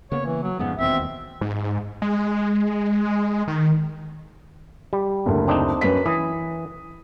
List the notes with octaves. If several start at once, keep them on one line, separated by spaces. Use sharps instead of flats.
C#3 A#3 B3 C#5
E3
F#3
F2 G#2 C#3 B3
E1 D#2 B2 C4 E5
G#2
G#3
D#3
G3
F#1 D2
C4 D4 D#4
F#2 B4 B6
E3 D#6